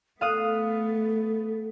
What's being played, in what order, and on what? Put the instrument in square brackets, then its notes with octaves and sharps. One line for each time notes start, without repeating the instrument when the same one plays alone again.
[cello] A3 B3 [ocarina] A4 [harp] F5 D#6 F#6